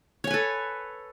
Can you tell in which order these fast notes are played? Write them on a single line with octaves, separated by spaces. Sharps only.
C#5 G#5 B4 A4